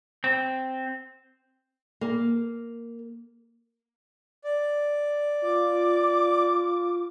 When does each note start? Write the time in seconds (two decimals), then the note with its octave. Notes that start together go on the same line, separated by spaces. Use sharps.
0.24 C4
2.01 A#3
4.44 D5
5.42 F4 D6